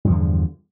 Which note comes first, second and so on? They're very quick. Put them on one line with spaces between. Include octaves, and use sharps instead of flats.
G2 F3 E2 D3